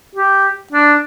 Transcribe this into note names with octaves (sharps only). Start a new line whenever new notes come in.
G4
D4